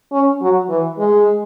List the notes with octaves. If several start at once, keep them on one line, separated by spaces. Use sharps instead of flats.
C#4
F#3
E3
G#3